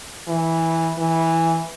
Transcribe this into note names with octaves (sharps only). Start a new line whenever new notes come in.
E3
E3